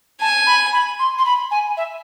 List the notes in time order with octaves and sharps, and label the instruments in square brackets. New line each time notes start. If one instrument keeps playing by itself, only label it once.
[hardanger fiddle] G#5 [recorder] A5
[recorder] B5
B5
C6
C6
B5
G#5
E5